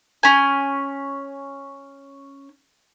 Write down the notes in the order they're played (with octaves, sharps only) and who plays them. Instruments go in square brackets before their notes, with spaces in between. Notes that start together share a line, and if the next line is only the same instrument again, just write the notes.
[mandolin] C#4 G#5